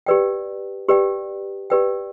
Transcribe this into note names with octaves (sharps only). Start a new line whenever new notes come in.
G4 B4 D5 G5
G4 B4 D5 G5
G4 B4 D5 G5